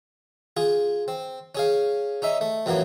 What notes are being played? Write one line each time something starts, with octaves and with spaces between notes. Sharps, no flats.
F4 G#4
C4
C#4 G#4 F5
C#4 D#4 E5
A3
F2 A2 E3 F#3 A#3